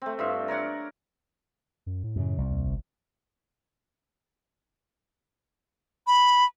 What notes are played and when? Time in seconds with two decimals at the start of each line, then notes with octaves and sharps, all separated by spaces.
0.02 A3 C4
0.19 G2 F4 E5
0.48 A#4 C#5 D5 F#5
1.86 F#2
2.04 A2
2.16 F#2 C#3
2.38 C2
2.51 D#2
2.67 G1
6.07 B5